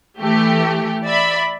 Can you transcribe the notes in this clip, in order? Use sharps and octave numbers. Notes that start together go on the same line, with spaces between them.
E3 A3 G4
D5 E5 B5